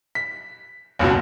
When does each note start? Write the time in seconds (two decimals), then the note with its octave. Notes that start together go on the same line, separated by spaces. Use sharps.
0.15 B6
0.99 F#1 C#2 F#2 B2